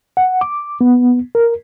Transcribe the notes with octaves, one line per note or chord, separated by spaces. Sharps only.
F#5
D6
B3
A#4